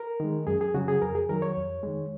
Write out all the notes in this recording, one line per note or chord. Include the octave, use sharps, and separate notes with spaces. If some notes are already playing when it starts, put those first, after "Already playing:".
Already playing: A#4
D#3 G#3
F#2 G#4
G#4
C#3 F#3 F#4
G#4
F2 A#4
G#4
D#3 F#3 A#4
C#5
F2
D#3 G#3